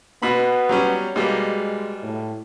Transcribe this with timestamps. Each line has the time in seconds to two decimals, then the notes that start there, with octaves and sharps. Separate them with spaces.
0.22 B2 B3 B5
0.69 F#3 G3 C#4
1.16 B2 G3 G#3 A#3
2.03 A2